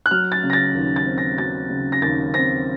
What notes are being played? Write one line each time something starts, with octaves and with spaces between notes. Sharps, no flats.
F#6
F#3 F6
A6
C#3
A#6
A6
D#2
A6
C4
A#6
F#3 A6
C#3
A#6
D#2 A6
C4 A#6